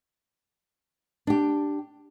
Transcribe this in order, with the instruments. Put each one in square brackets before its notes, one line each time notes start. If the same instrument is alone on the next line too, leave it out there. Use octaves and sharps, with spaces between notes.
[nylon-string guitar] D4 G4